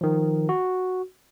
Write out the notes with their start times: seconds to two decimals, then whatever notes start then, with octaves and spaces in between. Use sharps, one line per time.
0.01 D#3 F3
0.49 F#4